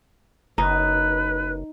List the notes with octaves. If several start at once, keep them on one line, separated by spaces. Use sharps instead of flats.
F#1 D#4 B4